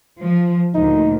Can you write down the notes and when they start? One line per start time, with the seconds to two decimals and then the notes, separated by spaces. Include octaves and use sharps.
0.22 F3
0.75 D2 A#2 D#4